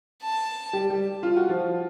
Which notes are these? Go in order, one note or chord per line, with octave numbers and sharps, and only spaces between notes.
A5
G3 G4
G3 G4
F4
F#4
F3 F4